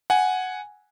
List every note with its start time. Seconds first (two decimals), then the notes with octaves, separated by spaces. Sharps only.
0.10 F#5 G#5